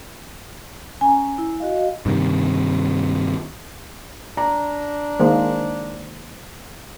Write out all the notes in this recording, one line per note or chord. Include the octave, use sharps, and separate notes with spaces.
C#4 G#5 A#5
E4
F#4 D#5 F5
G2 C3 D#3
D4 A#5
D#3 G#3 A#3 C5